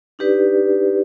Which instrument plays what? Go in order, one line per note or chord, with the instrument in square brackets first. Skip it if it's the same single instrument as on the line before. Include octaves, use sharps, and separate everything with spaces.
[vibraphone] D4 D#4 G4 B4 D5